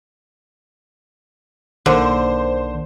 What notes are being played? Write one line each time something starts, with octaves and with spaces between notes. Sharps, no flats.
B1 D3 D#3 A#3 C5